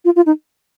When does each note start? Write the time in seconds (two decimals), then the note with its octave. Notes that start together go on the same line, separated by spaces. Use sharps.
0.05 F4
0.16 F4
0.26 D#4